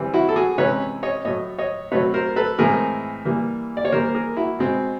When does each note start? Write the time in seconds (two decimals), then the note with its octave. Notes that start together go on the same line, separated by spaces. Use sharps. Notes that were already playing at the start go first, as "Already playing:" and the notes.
Already playing: E3 G3 C4
0.14 E4 F#4
0.29 A4
0.36 F#4 G#4
0.58 C3 E3 G#3 C#4 B4 C#5
1.03 C#5 D#5
1.25 A2 F#3 A3 C#5 D#5
1.58 C#5 D#5
1.92 B2 F#3 A3 C4 B4 C#5
2.14 A#4 C5
2.36 A4 B4
2.58 A2 E3 G#3 C4 G#4 A#4
3.25 E3 G3 A#3
3.77 D5
3.85 C#5
3.92 E3 G3 A#3 A#4 C5
4.14 G#4 A#4
4.37 E4 F#4
4.59 B2 G#3 C4